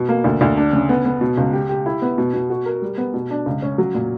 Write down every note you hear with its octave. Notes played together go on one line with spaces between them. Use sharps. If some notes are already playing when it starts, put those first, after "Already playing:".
Already playing: B2
A#3
D2
D2
D4
C#3
B3
B3
B2
C#2
G4
G4
E4
B3
B2
B2
F#4
A#4
G3
B3
B2
D4
C#2
C#4
F#3
A#2